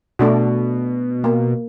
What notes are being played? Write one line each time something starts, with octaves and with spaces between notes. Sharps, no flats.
B2 A3 D4 F#4
A#3